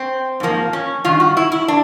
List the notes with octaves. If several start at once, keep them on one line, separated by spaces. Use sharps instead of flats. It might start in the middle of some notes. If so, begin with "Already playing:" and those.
Already playing: C4
G#2 F3 A#3
C#4
G2 D#3 F4
F#4
E4
E4
D4